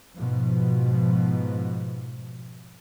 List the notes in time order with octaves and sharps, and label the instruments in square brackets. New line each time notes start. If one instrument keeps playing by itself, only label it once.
[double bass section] G#2 B2 F3